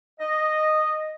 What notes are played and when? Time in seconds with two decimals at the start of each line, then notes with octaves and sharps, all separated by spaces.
0.20 D#5